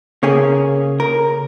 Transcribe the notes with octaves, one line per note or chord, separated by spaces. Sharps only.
C#3 A#3 C#4 G#4
A#4